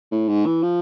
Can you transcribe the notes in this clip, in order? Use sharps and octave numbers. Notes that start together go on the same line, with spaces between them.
A2
G#2
E3
F3